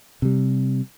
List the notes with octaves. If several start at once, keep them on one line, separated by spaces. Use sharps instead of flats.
C3 G3